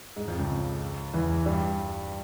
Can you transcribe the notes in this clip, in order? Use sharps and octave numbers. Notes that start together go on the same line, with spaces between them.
G#2 G#3
F2 F3
C#2 C#3
E2 E3
G2 G3